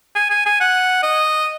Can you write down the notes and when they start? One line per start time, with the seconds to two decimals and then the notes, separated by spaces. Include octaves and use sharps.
0.16 G#5
0.30 G#5
0.46 G#5
0.60 F#5
1.03 D#5